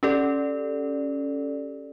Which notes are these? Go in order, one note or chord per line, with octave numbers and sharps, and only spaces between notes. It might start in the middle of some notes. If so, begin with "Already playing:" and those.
C#4 G4 A4 D5